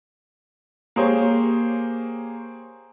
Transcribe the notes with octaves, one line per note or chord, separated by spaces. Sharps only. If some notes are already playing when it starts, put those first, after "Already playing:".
A#3 G4 G#4 C5 C#5